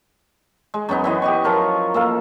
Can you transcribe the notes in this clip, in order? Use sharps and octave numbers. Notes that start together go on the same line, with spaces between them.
G#3
F#2 F#3 B3 D#4
E3 B3 D#5
G4 D#5 C#6
F3 F#3 A#4
A#3 A4 F5